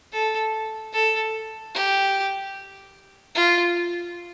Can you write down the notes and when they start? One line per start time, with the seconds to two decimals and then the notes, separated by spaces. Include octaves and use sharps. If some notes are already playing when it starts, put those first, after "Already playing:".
0.12 A4
0.93 A4
1.74 G4
3.35 F4